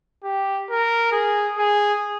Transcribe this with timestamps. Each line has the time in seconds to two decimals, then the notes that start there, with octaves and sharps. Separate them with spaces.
0.24 G4
0.70 A#4
1.12 G#4
1.57 G#4